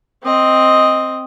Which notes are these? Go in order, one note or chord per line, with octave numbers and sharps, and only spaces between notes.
C4 D#5